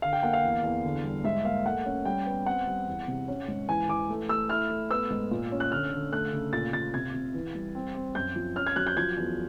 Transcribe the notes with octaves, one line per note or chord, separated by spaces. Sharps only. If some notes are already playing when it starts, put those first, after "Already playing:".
D3 F5
G5
A#3 F#5
F5
E2
E2
D3
G3
G#2 E5
A#3 F5
A3 F#5
C#4
G3 G5
B3
C4 F#5
G3
E2
C3
C#4
G#2
E3 G#5
E3 D6
A3
A3 E6
E4 F6
A3
B3 E6
G#2
A#2
C#4
F#6
D3 F6
D3
A3 F#6
C#3
A#2 A6
A#2 A6
C3 G#6
C3
E3
G3
C4
C4
F#2 G6
F3
C#4 F6
G#6
F#3 F#6
G6
F3 G#6
E2